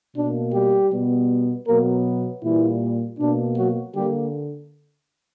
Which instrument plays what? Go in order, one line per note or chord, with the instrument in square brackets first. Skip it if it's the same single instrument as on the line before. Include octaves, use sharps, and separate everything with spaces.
[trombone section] B2 A#3 D4
G3 G4
B2 G3 B3
B2 F#3 A#3 B3 A#4
A#2 E3 G3 A#3 E4
B2 A#3 D4
F#3 F#4
D3 G3 A#3 G4